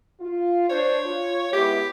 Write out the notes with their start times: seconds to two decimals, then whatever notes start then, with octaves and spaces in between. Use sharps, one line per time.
0.20 F4
0.69 D4 C5 C#5
1.05 F4
1.53 G#3 B3 E4 G4